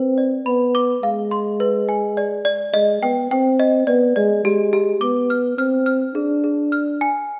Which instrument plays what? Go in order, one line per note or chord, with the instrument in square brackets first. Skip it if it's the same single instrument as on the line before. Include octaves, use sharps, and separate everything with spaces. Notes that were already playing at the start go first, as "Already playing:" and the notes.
Already playing: [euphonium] C4 [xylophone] B4
[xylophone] D5
[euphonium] B3 [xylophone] B5
[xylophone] D6
[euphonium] G#3 [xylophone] F5
[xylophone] C6
B4
G#5
D5
D5
[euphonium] G#3 [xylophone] D#5
[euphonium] B3 [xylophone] G5
[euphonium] C4 [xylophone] G5
[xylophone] D#5
[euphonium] B3 [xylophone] D5
[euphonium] G#3 [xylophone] D5
[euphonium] G#3 [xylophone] G4
[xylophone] G4
[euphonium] B3 [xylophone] D6
[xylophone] F6
[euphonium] C4 [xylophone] F6
[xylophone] F6
[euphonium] D4 [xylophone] G#4
[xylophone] G#4
F6
G#5